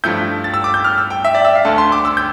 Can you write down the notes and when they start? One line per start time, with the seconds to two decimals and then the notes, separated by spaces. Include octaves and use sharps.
0.04 G2 F3 A3 E4 G6
0.44 A6
0.54 E6
0.64 D6
0.74 G6
0.85 F6
0.98 E6
1.10 G5
1.24 E5
1.35 D5
1.45 E5
1.55 F5
1.65 D2 D3 A3 A5
1.78 C6
1.92 D6
2.05 E6
2.17 G6